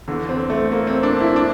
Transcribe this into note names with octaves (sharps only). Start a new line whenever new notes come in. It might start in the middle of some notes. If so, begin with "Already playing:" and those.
E2 D3
C4
A3
A#3
C4
D4
E4
D4